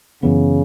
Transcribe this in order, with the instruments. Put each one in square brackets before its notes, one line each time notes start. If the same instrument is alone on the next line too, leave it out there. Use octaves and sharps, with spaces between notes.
[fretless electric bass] F#2 E3 B3 [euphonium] C#3